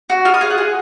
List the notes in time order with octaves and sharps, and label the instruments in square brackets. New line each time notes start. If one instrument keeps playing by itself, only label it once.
[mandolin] F#4
F4 F6
D#6
G#4 F5
F#5
G#4